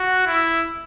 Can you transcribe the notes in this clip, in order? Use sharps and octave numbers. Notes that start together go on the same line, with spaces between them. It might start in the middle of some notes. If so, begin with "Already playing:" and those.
Already playing: F#4
E4